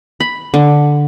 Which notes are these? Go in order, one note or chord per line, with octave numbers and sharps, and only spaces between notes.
B5
D3